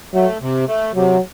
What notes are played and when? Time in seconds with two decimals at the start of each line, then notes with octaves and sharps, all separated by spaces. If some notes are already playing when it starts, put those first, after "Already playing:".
0.14 F#3 A3
0.41 C3
0.68 A3
0.95 C3 F#3